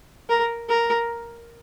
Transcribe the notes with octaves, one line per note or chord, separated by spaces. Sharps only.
A#4
A#4